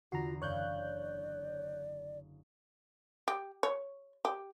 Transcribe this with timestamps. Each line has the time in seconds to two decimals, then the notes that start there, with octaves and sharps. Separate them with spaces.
0.12 E2 D3 F4 F#4 A#5 C7
0.42 F#1 C#5 D5 F5 F#6 G6
3.28 G4
3.63 C#5
4.25 G4